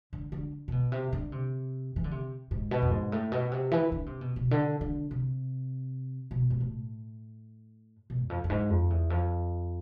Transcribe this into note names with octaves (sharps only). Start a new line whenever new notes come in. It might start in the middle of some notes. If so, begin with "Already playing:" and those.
D3
D3
C3
B2
C3
D3
C3
E3
D3
C3
G#2
B2
F2
G#2
A2
B2
C3
E3
D3
C3
B2
B2
D3
D3
C3
B2
G#2
A2
B2
E2
F2
F2
G#2
F2
E2
F2